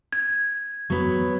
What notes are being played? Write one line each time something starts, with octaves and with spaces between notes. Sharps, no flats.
G#6
F#3 B3